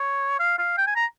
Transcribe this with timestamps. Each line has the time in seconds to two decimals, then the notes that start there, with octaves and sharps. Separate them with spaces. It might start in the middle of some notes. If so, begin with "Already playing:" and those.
Already playing: C#5
0.40 F5
0.59 F5
0.78 G5
0.87 G#5
0.96 A#5